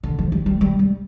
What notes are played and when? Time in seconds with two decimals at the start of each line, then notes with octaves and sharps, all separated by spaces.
0.03 D3
0.18 F3
0.32 G3
0.46 G3
0.61 G3
0.79 G3